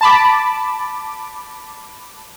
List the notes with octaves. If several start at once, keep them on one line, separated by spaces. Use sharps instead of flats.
A5 B5 D6